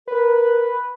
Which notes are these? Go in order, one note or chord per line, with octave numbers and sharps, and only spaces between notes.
A#4 B4